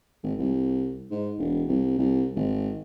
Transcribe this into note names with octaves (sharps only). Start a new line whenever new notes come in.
G#1
C2
G#2
E1
C2
C2
G#1